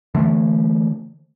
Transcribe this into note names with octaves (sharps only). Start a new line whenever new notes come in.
D3 E3 A3